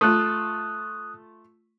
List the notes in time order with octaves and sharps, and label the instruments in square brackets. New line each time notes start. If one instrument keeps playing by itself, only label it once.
[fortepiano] A3 F4 [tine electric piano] D#6 F#6